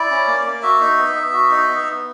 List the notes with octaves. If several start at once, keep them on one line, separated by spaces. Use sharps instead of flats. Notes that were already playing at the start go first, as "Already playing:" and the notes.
Already playing: E4 D5
C#4
A#3
A#3
F#4 E5
D#4
B3
B3
F#4
D#4
B3
B3